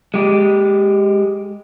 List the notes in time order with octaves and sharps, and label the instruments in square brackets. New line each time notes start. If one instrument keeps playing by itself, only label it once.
[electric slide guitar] G#3 G4